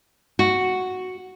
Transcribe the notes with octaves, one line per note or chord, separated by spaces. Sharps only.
F#4